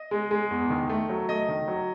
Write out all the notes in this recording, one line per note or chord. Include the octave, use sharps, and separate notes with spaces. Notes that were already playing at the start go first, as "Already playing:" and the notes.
Already playing: D#5
G#3
G#3
E2
D#3
A3
F#3
A3 D#5
D#3
F#3